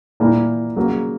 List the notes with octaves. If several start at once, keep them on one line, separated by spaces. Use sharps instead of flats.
A#2 A#3 E4
C#3 F#3 A#3